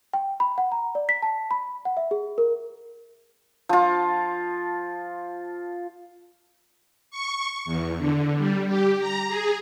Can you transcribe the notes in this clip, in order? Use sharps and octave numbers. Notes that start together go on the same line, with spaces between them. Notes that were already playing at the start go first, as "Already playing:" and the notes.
G5
B5
F#5
A#5
D5
B6
A5
B5
F#5
E5
G#4
A#4
F3 F4
C#6
E2
D3
G3
G4
A#5
G#4